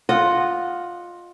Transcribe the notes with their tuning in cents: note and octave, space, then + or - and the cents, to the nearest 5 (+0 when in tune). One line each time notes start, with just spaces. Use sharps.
F4 +10 D#5 -15 F#5 +0